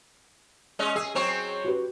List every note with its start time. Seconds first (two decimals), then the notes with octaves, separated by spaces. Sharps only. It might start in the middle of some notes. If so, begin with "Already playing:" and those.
0.79 G#3 C#4 D#5
0.96 G#4 D#6 E6
1.15 F#3 C4 G#4 C#5
1.64 F#4 G4 B4